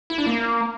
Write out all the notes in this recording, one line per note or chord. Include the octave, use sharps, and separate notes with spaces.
E4
D4
A#3